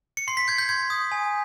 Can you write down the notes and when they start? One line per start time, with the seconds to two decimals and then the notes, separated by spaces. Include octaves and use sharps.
0.17 C#7
0.28 C6 C7
0.37 B6
0.48 G6 G#6
0.58 G6
0.69 C6 G#6
0.90 D#6
1.12 G#5